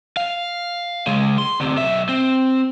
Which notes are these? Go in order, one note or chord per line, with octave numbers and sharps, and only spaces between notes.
F5
C#3 G#3
C6
D2 C3
B1 E5
C4